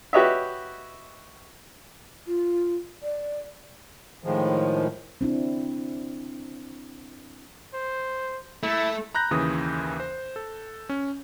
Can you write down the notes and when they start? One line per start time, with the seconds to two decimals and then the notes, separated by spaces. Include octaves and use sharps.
0.13 F#4 G4 B4 C#5 D#5 E5
2.27 F4
3.03 D5
4.24 A2 D#3 F3 G#3
5.21 C4 D4 E4
7.74 C5
8.63 A3 E4
9.15 A#5 B5 F#6 G6 A#6
9.31 D#2 C#3 E3 D#6
10.00 C5
10.36 A4
10.89 C#4